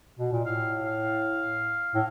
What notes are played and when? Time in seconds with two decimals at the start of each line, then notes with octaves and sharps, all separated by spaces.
0.19 B2
0.32 A#2
0.45 A2 F5
0.85 F5
1.95 A2